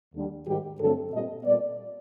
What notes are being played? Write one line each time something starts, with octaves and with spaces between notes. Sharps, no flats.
D#2 D3 G3
G#2 D#3 G3 G4
G2 D3 F#3 A3 C4 A4
A#2 G3 C4 D#5
A#2 G3 B3 D5